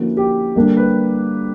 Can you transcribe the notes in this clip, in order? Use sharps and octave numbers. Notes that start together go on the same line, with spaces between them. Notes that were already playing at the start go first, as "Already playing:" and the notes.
Already playing: D3 F3 A#3 C#4 E4 F#4
G4
D3 G3 A#3 D4
B4